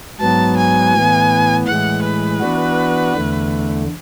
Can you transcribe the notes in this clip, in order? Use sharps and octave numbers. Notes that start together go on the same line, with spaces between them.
G#2 F#3 B3 A5
G#5
A2 E3 B3
A2 E3 G#3 F#5
B4
E3 B3 D4 F#4
E2 D3 A3